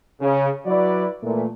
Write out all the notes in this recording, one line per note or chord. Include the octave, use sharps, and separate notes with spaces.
C#3
F#3 E4 F#4 B4 D5
A#2 E3 A3